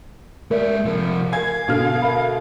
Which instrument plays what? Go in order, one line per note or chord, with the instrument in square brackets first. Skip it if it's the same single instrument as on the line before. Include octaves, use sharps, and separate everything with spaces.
[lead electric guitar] G#3 E5 [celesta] A#4 D5
[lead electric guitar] C3 F3
[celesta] A#4 G#5 [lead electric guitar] F5 [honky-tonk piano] G#6
[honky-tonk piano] B2 D3 F6
[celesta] A#4 E5 B5